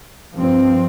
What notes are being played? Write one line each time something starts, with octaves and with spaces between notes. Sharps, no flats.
G2 F3 C4